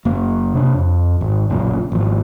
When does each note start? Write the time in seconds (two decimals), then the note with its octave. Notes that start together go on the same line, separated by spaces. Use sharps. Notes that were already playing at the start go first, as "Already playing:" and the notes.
0.05 F#1 A#3
0.54 C3 D4
0.74 F2
1.21 G#1
1.50 F#1 B1 F#2 A#2
1.92 G#1 F3